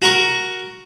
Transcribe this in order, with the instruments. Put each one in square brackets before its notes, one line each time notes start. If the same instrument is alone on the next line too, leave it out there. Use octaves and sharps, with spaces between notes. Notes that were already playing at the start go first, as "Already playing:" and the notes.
[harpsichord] F#4 A#4 C#6